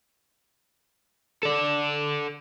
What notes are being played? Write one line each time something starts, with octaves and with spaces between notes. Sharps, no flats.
A4 D5